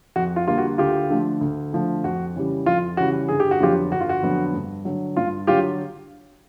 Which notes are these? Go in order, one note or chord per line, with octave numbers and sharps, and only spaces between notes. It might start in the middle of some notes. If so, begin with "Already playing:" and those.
F2 F#4
F4
D3 G3 A#3 F4
F#4
D2 F4 G4
D3 F3 A3
D2
D3 F3 A3
F2 F#4
C#3 E3 G3
F2 F4
C#3 E3 G3 F#4
G1 G#4
G4
F#4
F2 D3 F#3 B3 F4 G4
G1 F#4
F4
F#4
F2 D3 F#3 B3
G2
D3 F#3
G2 F4
D3 F#3 F4 G4